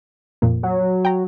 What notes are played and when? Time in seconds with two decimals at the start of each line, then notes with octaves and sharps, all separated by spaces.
0.42 F2 A#2 A#3
0.63 F#3
1.05 G5 A#5